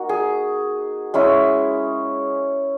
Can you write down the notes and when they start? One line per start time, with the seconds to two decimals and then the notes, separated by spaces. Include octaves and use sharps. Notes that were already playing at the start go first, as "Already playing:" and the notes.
Already playing: A#3 D#4 F#4
0.09 G#4
1.14 G#3 C#4 E4